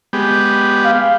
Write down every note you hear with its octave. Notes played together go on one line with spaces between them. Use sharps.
G#3 B3 G4
F5